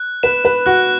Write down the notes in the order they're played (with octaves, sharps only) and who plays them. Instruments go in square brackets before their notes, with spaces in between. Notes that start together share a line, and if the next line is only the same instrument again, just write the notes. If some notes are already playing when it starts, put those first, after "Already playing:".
Already playing: [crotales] F#6
[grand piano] B4 [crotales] E7
[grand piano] B4
[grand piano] F#4 [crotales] F#6